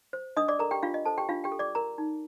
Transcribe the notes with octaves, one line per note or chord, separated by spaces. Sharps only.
C5
D4 D#5 D#6
D5 D6
A4 A#4 A#5
G4 G5
D4 F4 F5
D#5
A4 C5 A5
G4 G5
D4 F4 F5
G4 G5
A4
D5 D6
A#4 A#5
D#4